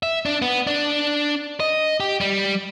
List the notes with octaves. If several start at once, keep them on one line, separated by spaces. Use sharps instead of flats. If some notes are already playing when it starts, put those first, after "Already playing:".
E5
D4
B3
D4
D#5
G4
G3